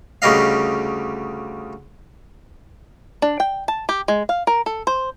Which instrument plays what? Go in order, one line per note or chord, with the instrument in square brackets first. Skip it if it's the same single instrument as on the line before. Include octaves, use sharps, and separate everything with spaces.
[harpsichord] D2 C#3 G3 D#5 F5
[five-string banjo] D4
G5
A5
G4
G#3
F5
A#4
A4
C5